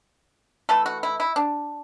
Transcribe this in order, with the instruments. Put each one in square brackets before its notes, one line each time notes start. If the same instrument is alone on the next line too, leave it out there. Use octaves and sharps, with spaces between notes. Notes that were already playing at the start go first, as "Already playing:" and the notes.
[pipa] E3 A3 A4
F#4
E4
E4
D4